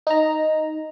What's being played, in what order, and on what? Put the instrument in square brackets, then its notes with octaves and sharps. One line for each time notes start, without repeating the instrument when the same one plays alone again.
[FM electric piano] D#4 A#5